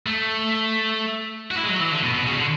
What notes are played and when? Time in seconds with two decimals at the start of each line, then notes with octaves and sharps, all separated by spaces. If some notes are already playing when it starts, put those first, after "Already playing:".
0.06 A3
1.51 F#4
1.57 E4
1.63 G#3
1.68 F#3
1.80 E3
1.91 D3
2.03 B2
2.14 B2
2.26 C#3
2.37 D3